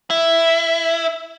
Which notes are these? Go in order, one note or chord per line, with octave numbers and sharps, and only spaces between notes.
E4